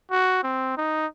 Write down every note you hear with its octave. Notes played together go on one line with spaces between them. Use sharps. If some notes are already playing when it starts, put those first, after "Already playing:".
F#4
C4
D#4